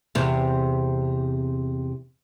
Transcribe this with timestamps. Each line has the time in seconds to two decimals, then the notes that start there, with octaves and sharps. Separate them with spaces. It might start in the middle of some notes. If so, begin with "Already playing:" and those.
0.15 E2 C3